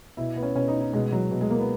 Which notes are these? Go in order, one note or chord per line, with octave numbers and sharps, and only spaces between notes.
B2 E4
B3
C#4
B2 C#4
D#4
D#4
B2 G#3
F#3
B2
G#3
A#3
B3